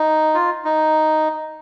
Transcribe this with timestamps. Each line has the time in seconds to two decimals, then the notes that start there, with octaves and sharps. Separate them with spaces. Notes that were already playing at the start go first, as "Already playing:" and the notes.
Already playing: D#4
0.34 F4
0.65 D#4